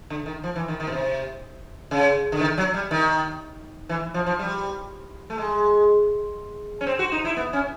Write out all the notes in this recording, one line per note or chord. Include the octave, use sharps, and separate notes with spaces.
D3
D#3
F3
E3
D#3
D#3
B2
C3
C#3
D3
D#3
F#3
G3
D#3
E3
F3
F3
G3
A3
G#3
C#4
C4
F#4
D#4
E4
B3
C#4